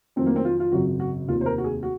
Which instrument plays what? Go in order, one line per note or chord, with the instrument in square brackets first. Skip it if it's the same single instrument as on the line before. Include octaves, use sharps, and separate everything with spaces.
[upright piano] F2 D#3 F#3 C4
A#3
C4
F4
F4
G#1 F#2 C#3 F#3 F#4
F#4
F1 D#2 D#3 F4
C5
A#4
F#4
G#4
F#4